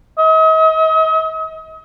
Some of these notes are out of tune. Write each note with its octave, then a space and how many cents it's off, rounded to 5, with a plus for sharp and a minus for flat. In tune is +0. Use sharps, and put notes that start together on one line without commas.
D#5 +40